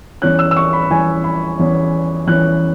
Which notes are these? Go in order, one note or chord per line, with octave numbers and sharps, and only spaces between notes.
E2 E3 C#4 F#6
E6
E6
C#6
B5
E2 E3 C#4 G#5
B5
E2 E3 C#4
E2 E3 C#4 F#6